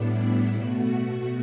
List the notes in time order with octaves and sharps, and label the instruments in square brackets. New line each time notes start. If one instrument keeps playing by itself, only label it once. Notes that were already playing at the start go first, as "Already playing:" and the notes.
Already playing: [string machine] A2 G3 B3 D4 E4
B2 A3 F#4